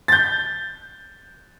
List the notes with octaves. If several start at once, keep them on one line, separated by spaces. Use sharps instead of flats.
G6 A6